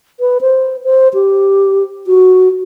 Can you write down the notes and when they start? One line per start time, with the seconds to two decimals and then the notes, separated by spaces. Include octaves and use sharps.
0.20 B4
0.41 C5
0.84 C5
1.14 G4
2.07 F#4